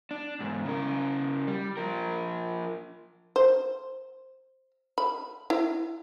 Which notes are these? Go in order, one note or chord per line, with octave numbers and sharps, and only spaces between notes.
D4
E2 G#2
C#3 A#4
G3
F3 A#4
C5
B5
E4